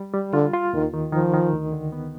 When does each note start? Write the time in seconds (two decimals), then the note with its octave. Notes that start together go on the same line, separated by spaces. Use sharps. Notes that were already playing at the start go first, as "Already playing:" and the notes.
Already playing: G3
0.14 G3
0.33 D3 F4
0.53 F4
0.73 D#2 D#3
0.94 D#3
1.12 D#3 F3
1.34 D#3
1.53 D2
1.72 D3
1.92 B3